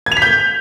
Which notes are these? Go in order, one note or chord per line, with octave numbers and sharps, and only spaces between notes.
G#6
F7
B6
G6